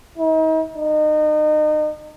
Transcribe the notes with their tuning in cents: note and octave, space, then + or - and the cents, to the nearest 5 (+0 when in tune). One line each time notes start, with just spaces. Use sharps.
D#4 +40
D#4 -30